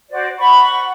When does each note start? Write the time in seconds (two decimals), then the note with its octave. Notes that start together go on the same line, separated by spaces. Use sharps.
0.10 F#4 C5 D5
0.38 F#5 B5 C#6